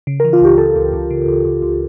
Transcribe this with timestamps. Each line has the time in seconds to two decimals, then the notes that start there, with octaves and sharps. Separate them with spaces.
0.07 C#3
0.20 E3 A#4
0.33 F4
0.41 C#2 G4
0.58 C#2 A4
0.76 C#2
0.93 C#2
1.11 C#3
1.28 C#2
1.45 C#2
1.62 C#2